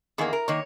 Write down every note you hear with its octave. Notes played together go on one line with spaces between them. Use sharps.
E2 D#3 A#3 G#4
A#4
D#3 A#3 C#5